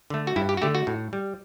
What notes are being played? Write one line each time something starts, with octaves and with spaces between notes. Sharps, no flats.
D3 A3
F#4
G2 E4
G4
F#4
D3 A3 G4
F#4
A2
G3